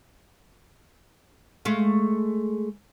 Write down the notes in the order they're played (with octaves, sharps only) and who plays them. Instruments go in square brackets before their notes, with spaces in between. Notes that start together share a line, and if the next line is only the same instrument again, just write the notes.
[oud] G#3 A3 F5